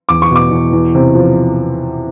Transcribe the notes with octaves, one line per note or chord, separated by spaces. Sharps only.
E2 D6
C#6
B2 D6
E2
E2
C3
F3